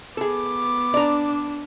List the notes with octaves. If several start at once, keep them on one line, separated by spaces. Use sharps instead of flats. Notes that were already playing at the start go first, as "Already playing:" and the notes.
B3 G#4 A4 D6
D4 D5 A#5